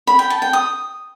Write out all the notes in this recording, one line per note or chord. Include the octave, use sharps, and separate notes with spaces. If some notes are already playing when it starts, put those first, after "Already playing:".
B5
G5
A5
G5
D#6